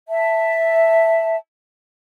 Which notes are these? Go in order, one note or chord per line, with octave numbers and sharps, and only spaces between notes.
E5 A5